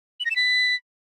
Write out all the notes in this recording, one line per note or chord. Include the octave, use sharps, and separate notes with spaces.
F#7
A#6
E7
B6